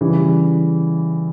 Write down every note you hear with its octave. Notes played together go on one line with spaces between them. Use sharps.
C#3 E3 G3